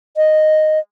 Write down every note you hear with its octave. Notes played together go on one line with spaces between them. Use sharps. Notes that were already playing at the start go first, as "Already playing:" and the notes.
D#5